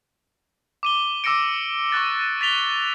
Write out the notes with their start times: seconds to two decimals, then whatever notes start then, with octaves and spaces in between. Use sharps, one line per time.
0.83 D6 D#7 G7
1.24 D6 E6 A#6 C#7 D7
1.92 C#6 D6 F#6 A6
2.41 A6 B6 F7 G7